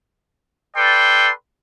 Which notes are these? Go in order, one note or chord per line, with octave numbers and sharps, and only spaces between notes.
A4 B4 D5 G5 C6